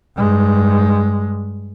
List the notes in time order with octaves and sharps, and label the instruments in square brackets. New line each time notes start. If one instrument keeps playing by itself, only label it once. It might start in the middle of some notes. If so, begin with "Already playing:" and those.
[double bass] G2 G#3